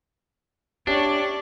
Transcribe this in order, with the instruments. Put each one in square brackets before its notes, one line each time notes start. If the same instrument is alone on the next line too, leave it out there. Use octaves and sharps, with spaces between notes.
[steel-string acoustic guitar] C#4 G4 E5 [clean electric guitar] D4 [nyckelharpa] D5 C#6